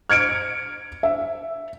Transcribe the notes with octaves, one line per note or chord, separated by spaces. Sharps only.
F6 G#6 C#7 D7
E5